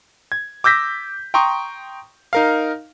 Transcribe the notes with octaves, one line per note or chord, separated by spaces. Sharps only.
G#6
D6 E6 G6 A#6 B6
G5 A#5 C6 C#6 D#6
D#4 A#4 F5